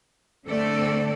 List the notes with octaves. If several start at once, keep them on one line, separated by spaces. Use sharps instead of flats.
D3 A3 C4 A4 D5